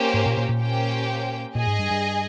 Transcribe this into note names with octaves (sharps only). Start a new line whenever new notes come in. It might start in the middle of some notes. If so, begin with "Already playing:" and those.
Already playing: A#3 C#4 G4 C5
G#2
A#2
A#2
A#2
A#3 C#4 G4 C5 G5
A#2 G#4 D#5 G#5
G#2
G2
G2